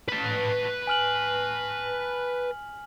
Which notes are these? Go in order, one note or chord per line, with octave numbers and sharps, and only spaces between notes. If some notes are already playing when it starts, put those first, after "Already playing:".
B4 A5 B6
G#5 F6 F#7